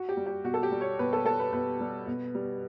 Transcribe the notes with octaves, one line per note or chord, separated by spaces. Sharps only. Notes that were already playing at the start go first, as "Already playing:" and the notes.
Already playing: F#4
G4
G3
G4
B2 F#4
A4
G4
G3
C#5
B2 B4
A4
G3 A4
B4
B2 B4
G3
B2
G3